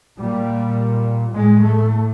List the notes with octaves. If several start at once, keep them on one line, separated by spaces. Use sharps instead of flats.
A#2 G3
A2 G#3
A3